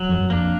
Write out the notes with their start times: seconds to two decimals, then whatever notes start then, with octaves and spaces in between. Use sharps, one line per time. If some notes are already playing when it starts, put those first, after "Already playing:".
Already playing: F#3
0.09 F2
0.20 F#2
0.30 F2 A#3 D4